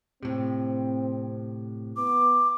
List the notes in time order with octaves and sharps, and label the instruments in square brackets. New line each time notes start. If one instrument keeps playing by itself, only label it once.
[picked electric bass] A2 C3 [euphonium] C4
[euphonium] B3 [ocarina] D6